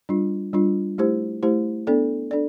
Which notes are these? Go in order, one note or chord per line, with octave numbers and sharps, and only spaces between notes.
G3 D4 F4
G3 D4 F4
A3 E4 G4 C5
A3 E4 G4 C5
B3 D4 A4 D5
D4 A4 D5